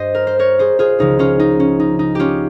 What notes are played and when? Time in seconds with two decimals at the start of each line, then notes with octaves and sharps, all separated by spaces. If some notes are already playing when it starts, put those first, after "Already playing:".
Already playing: G2 G3 C5 D#5
0.14 A#4
0.27 C5
0.39 A#4 C#5
0.59 G#4 C5
0.79 F4 G#4
0.99 C#2 C#3 F3 D#4
1.19 C#4 F4
1.39 D#4
1.60 C#4
1.80 D#4
1.99 D#4
2.15 C#4 F4 G4